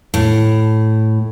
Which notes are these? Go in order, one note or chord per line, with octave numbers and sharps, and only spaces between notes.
A2